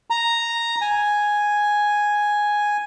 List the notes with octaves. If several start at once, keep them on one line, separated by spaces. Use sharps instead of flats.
A#5
G#5